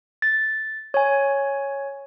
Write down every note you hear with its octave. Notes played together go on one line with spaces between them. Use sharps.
A6
C#5 G#5